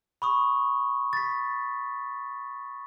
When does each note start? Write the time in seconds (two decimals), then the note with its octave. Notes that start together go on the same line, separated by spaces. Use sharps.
0.22 B5 C#6 D#6
1.13 A6 B6